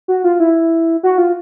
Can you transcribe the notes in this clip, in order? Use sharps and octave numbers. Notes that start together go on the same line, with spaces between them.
F#4
F4
E4
F#4
F4